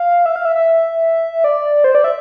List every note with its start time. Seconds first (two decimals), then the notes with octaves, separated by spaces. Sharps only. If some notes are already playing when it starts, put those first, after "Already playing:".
Already playing: F5
0.26 E5
0.36 F5
0.45 E5
0.56 E5
1.44 D5
1.84 C5
1.95 D5
2.04 E5